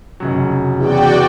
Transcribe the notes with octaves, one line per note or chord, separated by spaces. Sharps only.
F1 C#3 F#3
E2 F#4 D5 G5